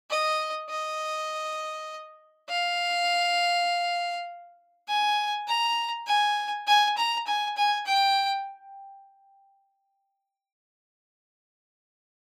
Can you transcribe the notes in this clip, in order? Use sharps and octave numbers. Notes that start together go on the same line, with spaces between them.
D#5
D#5
F5
G#5
A#5
G#5
G#5
A#5
G#5
G#5
G5